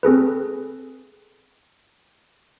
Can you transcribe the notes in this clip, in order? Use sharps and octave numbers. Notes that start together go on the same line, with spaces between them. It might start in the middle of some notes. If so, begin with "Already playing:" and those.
C4 G#4 A4 B4